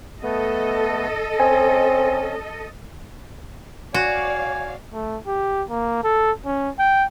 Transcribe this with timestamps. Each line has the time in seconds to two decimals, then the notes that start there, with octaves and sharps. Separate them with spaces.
0.23 A3 B3 A4 D#5
1.40 C4 C#4 G#5
3.94 F#4 C#5 D5 F5 G#5
4.94 A3
5.27 G4
5.70 A#3
6.04 A4
6.45 C#4
6.79 G5